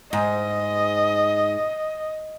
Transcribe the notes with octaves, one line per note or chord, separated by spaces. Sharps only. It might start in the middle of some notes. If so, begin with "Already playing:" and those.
G#2 D#5